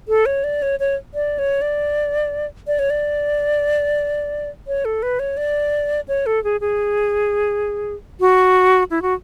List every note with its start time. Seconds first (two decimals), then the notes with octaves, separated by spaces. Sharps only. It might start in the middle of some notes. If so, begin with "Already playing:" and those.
0.08 A4
0.26 C#5
0.44 D5
0.62 C#5
0.80 C#5
1.14 D5
1.39 C#5
1.62 D5
2.67 D5
2.79 C#5
2.90 D5
4.67 C#5
4.85 A4
5.03 B4
5.19 C#5
5.37 D5
6.08 C#5
6.26 A4
6.44 G#4
6.61 G#4
8.20 F#4
8.91 E4
9.02 F#4